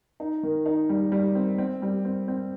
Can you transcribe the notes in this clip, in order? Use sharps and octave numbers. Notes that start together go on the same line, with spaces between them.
D#4
D#3
D#4
G3
G3
C4
C4
G3
C4
C4